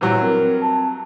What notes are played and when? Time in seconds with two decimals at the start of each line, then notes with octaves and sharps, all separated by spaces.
0.01 G2 A#2 E3 F#3
0.21 C4 A#4
0.61 A5